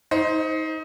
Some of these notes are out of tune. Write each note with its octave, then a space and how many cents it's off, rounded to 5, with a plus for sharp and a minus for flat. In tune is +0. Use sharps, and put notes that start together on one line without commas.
D#4 +25 C5 +0